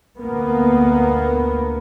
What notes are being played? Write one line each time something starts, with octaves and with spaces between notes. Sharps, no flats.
D2 A#3 B3